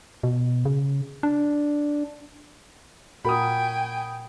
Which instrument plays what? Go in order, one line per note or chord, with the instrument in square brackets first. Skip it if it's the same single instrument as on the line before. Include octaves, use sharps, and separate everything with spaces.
[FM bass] B2
C#3
D4
[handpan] A#2 F#4 A#4 [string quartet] G5 G#5 [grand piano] B5 D#6